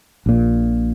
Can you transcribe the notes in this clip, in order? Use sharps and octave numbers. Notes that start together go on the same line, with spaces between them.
A#1 A#2